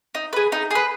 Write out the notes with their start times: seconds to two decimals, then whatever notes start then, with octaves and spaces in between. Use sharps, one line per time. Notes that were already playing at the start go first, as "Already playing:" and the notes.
0.15 D#4
0.33 G#4 B4
0.52 D#4
0.71 G#4 B4